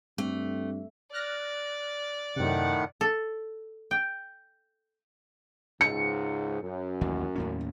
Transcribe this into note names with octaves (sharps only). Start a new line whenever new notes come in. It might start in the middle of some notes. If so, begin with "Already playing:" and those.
G2 A3 C4
D5 F6 F#6 A#6
F#2 A2 C3 D#3 F#5
A4
G5
C#2 G#2 C#7
F#2
A1 D#2
D#2 A2 C#4